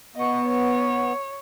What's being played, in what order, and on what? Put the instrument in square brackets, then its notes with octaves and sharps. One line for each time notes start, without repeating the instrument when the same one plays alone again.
[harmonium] B3 [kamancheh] D#5 C#6
[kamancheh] C#5